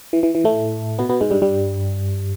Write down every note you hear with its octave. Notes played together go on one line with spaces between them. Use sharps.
E3
E3
E3
A2 A3
B2 B3
B2 B3
G#2 G#3
G2 G3
G2 G3